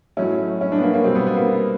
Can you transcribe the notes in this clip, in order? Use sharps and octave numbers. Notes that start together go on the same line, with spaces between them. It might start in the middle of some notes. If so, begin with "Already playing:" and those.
A2 F#3 A3 C#4
C#4
D4
B3
A#3
A#3
B2 G3 C4
B3
B3
A#3